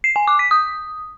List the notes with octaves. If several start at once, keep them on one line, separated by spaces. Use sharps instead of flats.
C7
G#5
D6
B6
D#6